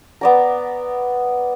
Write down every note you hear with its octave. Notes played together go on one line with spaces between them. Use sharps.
B3 D5 A#5